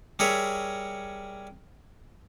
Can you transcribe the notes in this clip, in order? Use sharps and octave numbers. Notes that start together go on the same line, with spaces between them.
G3 G#4 A#4 C#5 E5